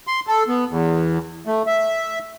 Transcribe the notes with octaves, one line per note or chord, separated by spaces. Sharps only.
C6
A4
B3
E2
A3
E5